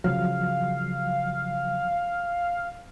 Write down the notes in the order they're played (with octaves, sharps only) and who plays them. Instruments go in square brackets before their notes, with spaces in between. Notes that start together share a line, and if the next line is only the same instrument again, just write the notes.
[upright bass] C#3 [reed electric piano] F3 F#3 [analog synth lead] F5